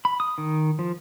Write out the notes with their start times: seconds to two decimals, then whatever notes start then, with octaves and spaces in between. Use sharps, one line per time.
0.05 B5
0.20 D#6
0.38 D#3
0.79 F3